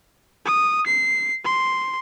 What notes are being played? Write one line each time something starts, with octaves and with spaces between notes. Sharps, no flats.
D#6
C7
C6